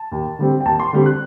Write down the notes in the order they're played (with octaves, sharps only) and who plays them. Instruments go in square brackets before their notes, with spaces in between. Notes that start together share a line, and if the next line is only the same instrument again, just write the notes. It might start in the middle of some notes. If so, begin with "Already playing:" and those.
Already playing: [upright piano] A5
D#2
D3 G3 C4
G5
D#2 A5
C6
D3 G3 C4
F#6